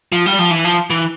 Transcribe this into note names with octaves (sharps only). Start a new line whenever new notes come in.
F3
G3
F3
E3
F3
E3